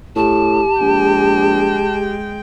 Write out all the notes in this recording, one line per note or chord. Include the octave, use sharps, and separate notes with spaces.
A2 G4 A5
A#1 G#3 G5